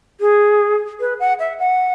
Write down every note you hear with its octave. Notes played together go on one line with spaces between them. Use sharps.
G#4
B4
F#5
E5
F#5